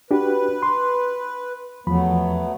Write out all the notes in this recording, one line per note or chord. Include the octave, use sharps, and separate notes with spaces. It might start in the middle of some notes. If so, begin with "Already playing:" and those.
D4 F#4 G4 B4
C6
E2 F3 F#3 A3 B3 B5